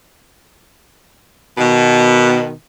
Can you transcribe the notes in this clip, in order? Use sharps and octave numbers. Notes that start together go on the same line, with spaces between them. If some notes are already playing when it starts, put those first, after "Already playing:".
B2 D#3